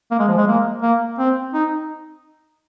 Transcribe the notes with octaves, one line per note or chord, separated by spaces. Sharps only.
A#3
G#3
F3
G#3
A#3
A#3
C4
D#4